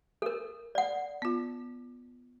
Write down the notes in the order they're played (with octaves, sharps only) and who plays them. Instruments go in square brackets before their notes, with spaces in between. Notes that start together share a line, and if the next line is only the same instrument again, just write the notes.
[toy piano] A4 A#4
D5 F#5
[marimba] B3 F4